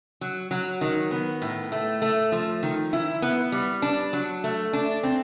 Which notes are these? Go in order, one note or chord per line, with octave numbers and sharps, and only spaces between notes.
F#3
F#3
D#3
B3
A2
A3
A3
F3
D#3
E4
B3
G3
D4
F#3
A3
D4
C4